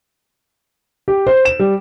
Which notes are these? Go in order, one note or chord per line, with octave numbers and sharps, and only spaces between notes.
G4
C5
E7
G3